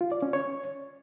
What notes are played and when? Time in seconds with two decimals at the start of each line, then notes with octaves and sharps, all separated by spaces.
0.01 F4
0.12 D5
0.22 C#4
0.33 C#5